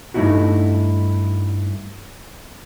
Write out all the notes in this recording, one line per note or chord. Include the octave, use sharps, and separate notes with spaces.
G2 A3 A#3 D#4 E4 F#4